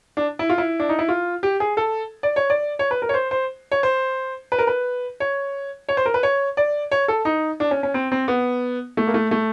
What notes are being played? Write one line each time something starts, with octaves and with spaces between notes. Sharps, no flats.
D4
E4
F4
E4
D4
D#4
E4
F4
G4
G#4
A4
D5
C#5
D5
C#5
B4
A#4
C#5
C5
C5
C#5
C5
B4
A#4
B4
C#5
C#5
C5
A#4
B4
C#5
D5
C#5
A4
D#4
D4
C#4
C#4
C4
C4
B3
A3
A#3
A3
A3